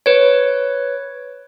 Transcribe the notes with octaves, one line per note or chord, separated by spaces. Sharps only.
B4 C#5